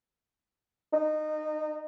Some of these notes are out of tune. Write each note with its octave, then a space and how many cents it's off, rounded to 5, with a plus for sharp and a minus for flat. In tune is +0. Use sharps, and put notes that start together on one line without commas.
D#4 -20